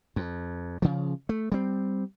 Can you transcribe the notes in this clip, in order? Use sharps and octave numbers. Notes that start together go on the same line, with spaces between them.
F2
C#3 F3
A3
G3 C4